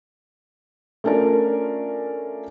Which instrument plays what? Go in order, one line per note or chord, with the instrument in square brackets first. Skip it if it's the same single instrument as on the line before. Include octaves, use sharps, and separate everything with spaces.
[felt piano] A3 C#4 D4 F4 A#4